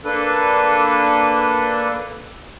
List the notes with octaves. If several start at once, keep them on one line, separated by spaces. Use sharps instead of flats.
A#3 D4 A4 B4